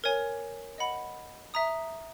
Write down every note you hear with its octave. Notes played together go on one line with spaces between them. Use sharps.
A#4 C#5 G#5
D#5 F#5 B5
E5 A#5 D#6